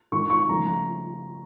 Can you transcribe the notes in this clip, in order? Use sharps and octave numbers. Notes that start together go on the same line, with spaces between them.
G#2 D#3 G#3 C#6
C#6
C#3 F3 A3 A#5
A#5